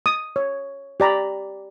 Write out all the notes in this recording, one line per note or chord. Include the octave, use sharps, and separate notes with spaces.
D#6
C#5
G4 D5 A#5 B5